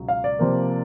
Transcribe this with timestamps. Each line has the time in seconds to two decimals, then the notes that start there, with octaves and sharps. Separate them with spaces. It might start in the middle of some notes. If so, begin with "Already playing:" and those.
Already playing: C#2 B2 F#3
0.08 F5
0.24 D5
0.39 C3 F3 A#3